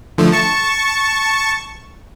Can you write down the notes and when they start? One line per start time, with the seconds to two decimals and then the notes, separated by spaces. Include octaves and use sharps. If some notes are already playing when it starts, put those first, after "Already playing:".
0.18 D3 F3 A3
0.32 A5 C#6